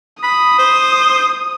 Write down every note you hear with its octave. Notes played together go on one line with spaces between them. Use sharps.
B5 D#6
C5